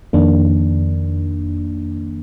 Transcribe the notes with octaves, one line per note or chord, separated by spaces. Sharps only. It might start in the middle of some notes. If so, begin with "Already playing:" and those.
F2 D#3 A#3 D4